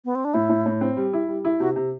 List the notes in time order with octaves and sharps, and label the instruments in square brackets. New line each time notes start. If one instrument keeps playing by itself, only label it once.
[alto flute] B3
C4
D4
[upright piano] A2 [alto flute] E4
[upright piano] A2
A2
C4
G3
E4
G3
E4
[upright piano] C3 [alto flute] F#4
[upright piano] C3